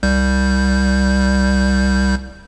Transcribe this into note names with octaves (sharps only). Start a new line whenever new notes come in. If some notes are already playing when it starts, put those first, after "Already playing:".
C2 G3 G6